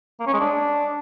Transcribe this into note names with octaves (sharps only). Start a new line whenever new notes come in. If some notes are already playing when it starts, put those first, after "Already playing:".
A#3
C#4
G#3
D4